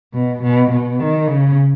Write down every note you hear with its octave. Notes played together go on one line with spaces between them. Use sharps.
B2
B2
B2
D#3
C#3